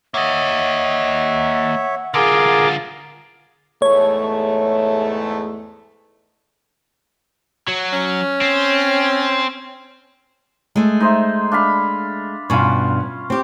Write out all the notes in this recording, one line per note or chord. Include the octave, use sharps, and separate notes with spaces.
A#3 C#5 D#5 E5 F#5
D3 F4 G#4 A#4 D6
E2 G#2 A3 C#5
F#3
C#4
C4
G#3 A3
D#4 C5 E5
D4 F5 B5
G2 B2 C#4 F4
C4 G4